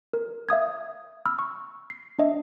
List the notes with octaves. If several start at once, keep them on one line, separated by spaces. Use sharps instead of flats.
A#4
E5 F5 D#6 G#6
B5 E6 F6
C#6
C7
D4 D#5 E5